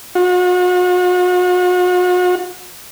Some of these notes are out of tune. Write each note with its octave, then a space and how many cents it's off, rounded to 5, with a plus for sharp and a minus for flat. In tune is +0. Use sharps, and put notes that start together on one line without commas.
F#4 -40